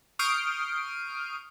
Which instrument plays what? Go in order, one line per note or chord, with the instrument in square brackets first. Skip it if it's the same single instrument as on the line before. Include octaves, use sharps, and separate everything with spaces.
[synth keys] C#6 D#6 F6 G6 C7 D7